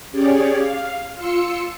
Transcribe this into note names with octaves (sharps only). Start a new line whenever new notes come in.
C#4 G4 G#4 C#5 D5
F5
F4 C6 E6 C#7